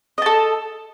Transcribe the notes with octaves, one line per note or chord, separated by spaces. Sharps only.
A4 D#5 A5